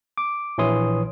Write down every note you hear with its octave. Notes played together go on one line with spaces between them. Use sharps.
D6
A#1 E3 E4 C#5 C6 D#6